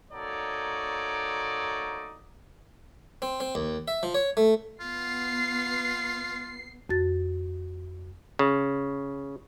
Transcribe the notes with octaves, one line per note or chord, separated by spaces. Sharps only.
A#3 D#4 F#4 A4 C#5 D5
C4
C4
D#2
E5
F3
C#5
A3
B3 F4 C7
F2 F#4 A6
C#3